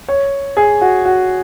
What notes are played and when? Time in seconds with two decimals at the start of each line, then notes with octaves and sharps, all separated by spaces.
0.08 C#5
0.57 G#4
0.81 F#4
1.05 F#4